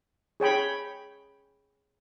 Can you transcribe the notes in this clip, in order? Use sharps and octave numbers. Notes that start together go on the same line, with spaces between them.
G#4 C#5 G5 B5